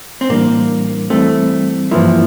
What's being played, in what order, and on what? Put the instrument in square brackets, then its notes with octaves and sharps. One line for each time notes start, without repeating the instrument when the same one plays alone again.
[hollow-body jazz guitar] C4
[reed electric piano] A2 E3 G3 D4 [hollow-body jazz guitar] A#3
[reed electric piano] E3 G3 C4 [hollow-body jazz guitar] A3
[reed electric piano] G2 E3 A#3 E4 [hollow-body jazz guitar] F3